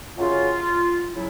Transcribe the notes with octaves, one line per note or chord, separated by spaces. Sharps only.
F#2 C#3 F#3 F4
C#3 F#3 E4